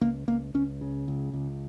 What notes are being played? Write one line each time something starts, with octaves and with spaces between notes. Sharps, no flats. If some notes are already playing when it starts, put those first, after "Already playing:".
C#2 A#3
C#2 A#3
C#2 C#4
C#3
C#2
C#2